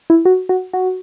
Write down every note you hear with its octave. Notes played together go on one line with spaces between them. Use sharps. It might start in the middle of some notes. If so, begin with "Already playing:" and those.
E4
F#4
F#4
F#4